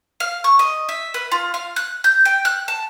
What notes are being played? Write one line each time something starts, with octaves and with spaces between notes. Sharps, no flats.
F5
C#6
D#5
E5
B4
F4
F5
F#6
G6
G5
F#6
A5